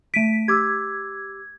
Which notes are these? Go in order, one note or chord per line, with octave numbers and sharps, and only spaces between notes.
A3 B6 D7 D#7
G4 D6 E6 G#6